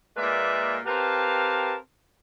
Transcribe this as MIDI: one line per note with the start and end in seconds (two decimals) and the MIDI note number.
0.17 0.78 46
0.17 0.78 56
0.17 0.78 58
0.17 0.78 71
0.17 0.78 74
0.17 0.78 76
0.86 1.75 60
0.86 1.75 67
0.86 1.75 70
0.86 1.75 71
0.86 1.75 77
0.86 1.75 81